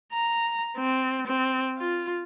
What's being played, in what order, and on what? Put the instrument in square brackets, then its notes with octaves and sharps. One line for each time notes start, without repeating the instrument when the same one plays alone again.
[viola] A#5
C4
C4
F4